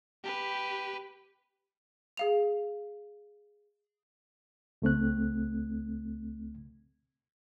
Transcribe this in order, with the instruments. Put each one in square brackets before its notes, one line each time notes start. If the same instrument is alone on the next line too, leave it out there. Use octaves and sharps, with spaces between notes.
[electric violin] G4 B4
[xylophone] G#4 F5 F7
[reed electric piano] C#2 A3 C4 F#6